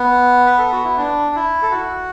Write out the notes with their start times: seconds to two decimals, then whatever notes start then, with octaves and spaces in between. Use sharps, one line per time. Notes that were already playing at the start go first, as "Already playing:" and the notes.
Already playing: B3
0.46 B4
0.58 A4
0.72 F#4
0.84 E4
0.97 D4
1.35 E4
1.62 A4
1.71 F#4